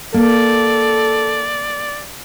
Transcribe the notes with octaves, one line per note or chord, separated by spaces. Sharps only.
A#3 A4 D5